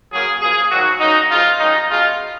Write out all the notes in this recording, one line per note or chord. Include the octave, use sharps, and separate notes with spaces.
C#3 F#3 A#3 C#4 G#4
C#3 F3 A#3 G#4
G#2 D#3 F#3 A#3 F#4
A#2 F#3 C#4 D#4
C#3 F3 G#3 F4
F#2 D#3 G#3 C#4 D#4
B2 G#3 C#4 F4